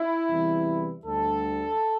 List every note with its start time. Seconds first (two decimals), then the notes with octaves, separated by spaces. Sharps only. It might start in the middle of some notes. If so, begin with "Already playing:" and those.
Already playing: E4
0.30 E2 C3 E3 G3
1.05 D2 D3 G3 A4